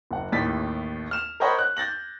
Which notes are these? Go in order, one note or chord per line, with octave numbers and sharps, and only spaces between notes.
F#1 F#5
A1 D#2 A2 A6 B6
F6 E7
A#4 C5 C#5 D#5 F#5 B5
F#6
G6 A6 A#6 F#7